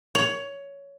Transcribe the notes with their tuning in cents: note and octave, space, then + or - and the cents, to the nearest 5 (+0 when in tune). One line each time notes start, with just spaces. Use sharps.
C#5 +15